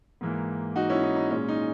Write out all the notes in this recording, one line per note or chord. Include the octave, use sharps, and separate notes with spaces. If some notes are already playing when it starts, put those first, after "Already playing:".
G#2 E3 A#3
D#4 F#4
C#4 E4
D#4
D#4
A#2 G#3 C#4
D#4